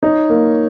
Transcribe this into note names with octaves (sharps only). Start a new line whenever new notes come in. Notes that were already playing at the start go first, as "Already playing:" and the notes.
D#4 C#5
A#3